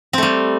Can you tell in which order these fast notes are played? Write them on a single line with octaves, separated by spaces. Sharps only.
C4 A3 G3